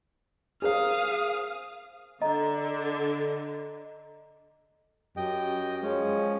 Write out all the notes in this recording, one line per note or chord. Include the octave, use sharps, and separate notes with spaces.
G#4 A#4 C5 F5 D#6
D3 D#5 A#5
F#2 G4 D#5 G5
F3 G#3 C#4